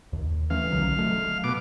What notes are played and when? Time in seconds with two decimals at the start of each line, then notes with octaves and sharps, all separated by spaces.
0.13 D#2
0.50 E3 A3 C#4 F5
0.71 B1 D3 F#3
0.98 F#3 A3
1.44 B2 D6